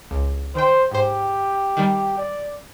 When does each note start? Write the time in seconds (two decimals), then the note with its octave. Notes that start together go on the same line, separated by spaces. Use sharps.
0.11 C#2
0.55 D#3 C5 G5
0.91 G#2 G4 C5
1.77 D#3 G3
2.18 D5